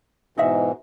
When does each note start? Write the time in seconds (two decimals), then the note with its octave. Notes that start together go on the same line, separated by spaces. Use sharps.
0.38 G#2 B2 E3 D#4 F#4 E5